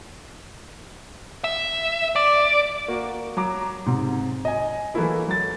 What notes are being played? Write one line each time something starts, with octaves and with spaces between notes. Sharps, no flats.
E5
D5
A#3 F#4
F#3 A#5 D6
G#2 C3
D#5 G#5
E3 F#3 A3 A#3 E4 G#4
F#3 A6